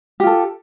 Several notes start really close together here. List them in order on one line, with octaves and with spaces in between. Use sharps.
G4 F4 A4